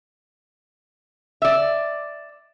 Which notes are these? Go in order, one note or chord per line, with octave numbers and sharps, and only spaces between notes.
D5 E5